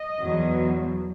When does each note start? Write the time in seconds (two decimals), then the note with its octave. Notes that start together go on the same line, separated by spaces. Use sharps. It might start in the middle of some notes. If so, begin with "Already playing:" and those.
Already playing: D#5
0.20 E2 B2 F#3